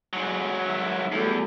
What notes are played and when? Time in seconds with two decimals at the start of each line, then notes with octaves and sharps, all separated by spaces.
0.13 G#2 F#3
0.64 D#3 E5
1.12 E2 F#3 G3 A3